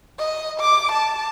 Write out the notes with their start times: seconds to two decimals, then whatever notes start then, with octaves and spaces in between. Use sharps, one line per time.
0.19 D#5
0.60 D6
0.92 A5